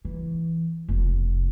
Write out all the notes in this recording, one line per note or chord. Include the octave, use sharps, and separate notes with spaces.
E3
F1